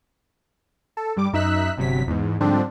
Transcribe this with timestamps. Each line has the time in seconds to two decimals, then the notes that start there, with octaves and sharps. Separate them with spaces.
0.97 A4
1.16 G2 G3 D6
1.33 F#2 D#4 E5 E6 F#6 B6
1.77 G1 C3 F#3 B6
2.07 E2 G#2
2.40 G#2 D3 F3 G3 C4 D4